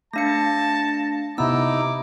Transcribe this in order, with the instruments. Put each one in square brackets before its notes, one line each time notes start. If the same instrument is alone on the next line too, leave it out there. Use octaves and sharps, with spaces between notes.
[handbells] A3 D4 C#7 [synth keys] F5 A#6 [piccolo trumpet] A5
[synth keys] C3 B3 [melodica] D#4 E4 [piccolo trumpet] D6 [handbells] E6